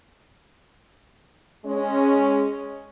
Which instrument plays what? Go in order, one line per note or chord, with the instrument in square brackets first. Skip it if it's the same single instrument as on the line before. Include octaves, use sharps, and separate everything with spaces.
[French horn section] G#3 C#4